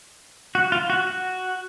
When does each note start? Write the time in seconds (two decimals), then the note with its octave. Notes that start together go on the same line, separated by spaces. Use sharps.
0.55 F#4
0.72 F4
0.90 F#4
1.07 F#4